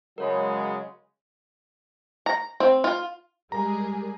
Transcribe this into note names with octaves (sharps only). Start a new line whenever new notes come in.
C#3 F#3 G#3 A#4 C#5 B5
A#5
C4
F4
G3 G#3 G#4 A#4 A#5